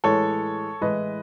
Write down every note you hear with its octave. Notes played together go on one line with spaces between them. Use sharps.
A2 E3 G#3 A4 C#5
A2 E3 G#3 B4 D#5